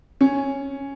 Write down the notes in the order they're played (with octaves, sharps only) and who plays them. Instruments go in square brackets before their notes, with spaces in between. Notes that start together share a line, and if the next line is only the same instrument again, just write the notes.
[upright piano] C#4